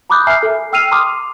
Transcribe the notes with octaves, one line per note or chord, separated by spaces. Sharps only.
A#5 B5 D6 D#6 F#6 G6
E5 G#5 A#5 F6 C7
A4
G5 E6 F6 C7 D#7 F7
A#5 C6 D6 D#6 F6